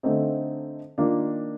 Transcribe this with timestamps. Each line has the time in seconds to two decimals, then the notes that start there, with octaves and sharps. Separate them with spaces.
0.03 D3 A3 C4 D#4
0.98 D#3 A#3 D4 F4